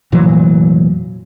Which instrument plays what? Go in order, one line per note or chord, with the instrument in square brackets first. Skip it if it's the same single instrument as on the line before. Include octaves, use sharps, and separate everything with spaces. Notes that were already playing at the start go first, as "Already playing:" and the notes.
[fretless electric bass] F1 A#2 E3 F#3